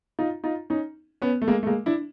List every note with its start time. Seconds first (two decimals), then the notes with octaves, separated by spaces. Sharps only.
0.19 D#4 F4
0.44 D#4 F4
0.70 C#4 D#4
1.22 B3 C#4
1.42 A3
1.48 G#3 A#3
1.63 A3
1.66 G#3 A#3
1.86 D4 E4